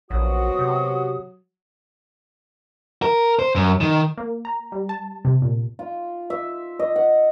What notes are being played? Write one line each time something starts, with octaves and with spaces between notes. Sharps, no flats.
A#1 B2 F#3 C4 F#4 D#6
C3
A#4
C5
F#2
D#3
A#3
A#5
G3
A5
C3
A#2
F4
E5
D#5
F#5